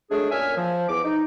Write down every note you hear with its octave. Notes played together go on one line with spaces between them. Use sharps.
F#3 G#3 A3 D4 G#4
F#2 A#2 C#4 E5 G#5 F6
F3
E2 D6
D#4